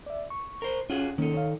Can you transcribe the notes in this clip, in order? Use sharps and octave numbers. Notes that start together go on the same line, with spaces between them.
D5 E5
C#6
A#4 C5
C#4 F4 F#4 G#4
D#3 A#3 C#4 A4
C#5 F5